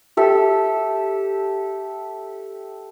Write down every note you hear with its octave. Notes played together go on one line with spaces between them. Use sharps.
G4 A4 E5